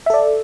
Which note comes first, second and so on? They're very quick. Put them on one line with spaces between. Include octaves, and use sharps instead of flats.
E5 A4 D5